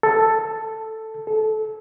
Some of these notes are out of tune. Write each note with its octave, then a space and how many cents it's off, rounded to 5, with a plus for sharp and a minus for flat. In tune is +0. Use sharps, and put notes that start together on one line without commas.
A4 +5
A4 -20